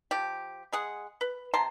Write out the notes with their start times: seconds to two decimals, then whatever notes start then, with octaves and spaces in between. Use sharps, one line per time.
0.11 F3 G4
0.72 G#3 G#4 F#5
1.21 B4
1.54 C3 A5 A#5 C6